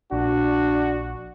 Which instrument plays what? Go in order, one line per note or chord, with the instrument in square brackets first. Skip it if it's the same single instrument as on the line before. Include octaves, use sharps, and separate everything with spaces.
[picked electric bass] A#1 [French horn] D4 [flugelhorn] F#4